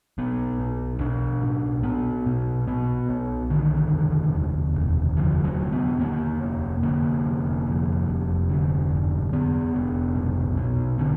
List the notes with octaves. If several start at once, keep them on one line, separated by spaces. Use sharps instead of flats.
B1 B3
B2
B2 D4
B1
B1 B3
B2
B2 B3
B1
D3 D#3
F1
D#2
F1
D3 F3
F#3
F1
B3
D#2 A#3
F1
D3 A#3
F1
F2
F1
D3
F1
F2 B3
F1
B1
B2
B2 D3